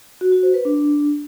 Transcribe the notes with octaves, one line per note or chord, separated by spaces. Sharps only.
F#4
F#4
C5
B4
D4